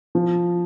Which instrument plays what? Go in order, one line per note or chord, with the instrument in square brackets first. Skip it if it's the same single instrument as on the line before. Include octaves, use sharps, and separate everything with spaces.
[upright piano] F3